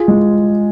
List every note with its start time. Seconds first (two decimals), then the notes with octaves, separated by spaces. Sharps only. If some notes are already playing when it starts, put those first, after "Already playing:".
Already playing: F4 G#4
0.08 G#3